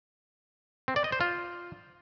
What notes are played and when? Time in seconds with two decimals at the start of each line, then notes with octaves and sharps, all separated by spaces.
0.88 C4
0.96 D5
1.04 D#5
1.12 C5
1.21 F4